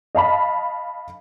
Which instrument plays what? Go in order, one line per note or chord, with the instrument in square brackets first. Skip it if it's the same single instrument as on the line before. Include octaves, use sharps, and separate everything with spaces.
[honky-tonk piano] D#5 F5 A5 B5